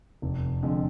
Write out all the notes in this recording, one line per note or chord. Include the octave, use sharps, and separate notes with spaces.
F1
F2 D3 G#3